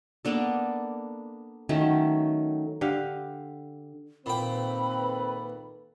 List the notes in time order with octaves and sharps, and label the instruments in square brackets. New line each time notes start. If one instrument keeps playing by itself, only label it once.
[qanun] A#3 B3 D4 A4
D#3 F#3 A3 C#4
[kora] D3 G4 F5
[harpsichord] A#2 G5 [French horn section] D#3 A4 B4 [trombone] C4 [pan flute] B5